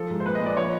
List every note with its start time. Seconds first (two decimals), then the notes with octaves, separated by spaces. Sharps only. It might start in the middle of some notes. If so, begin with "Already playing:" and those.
Already playing: F3 A4
0.10 G#2
0.20 C5
0.25 A#2 B4
0.35 D#5
0.41 A#2
0.46 D5
0.56 F3 C#5